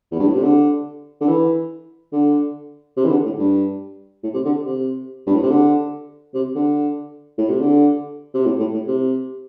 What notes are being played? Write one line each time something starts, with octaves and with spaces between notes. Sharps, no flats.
E2
G2
A2
C3
D3
D3
E3
D3
C3
E3
D3
A2
G2
A2
C3
D3
C3
G2
A2
C3
D3
C3
D3
A2
C3
D3
C3
A2
A2
A2
C3